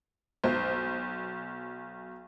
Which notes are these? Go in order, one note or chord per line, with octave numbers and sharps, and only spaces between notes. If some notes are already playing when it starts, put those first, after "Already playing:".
B1 C5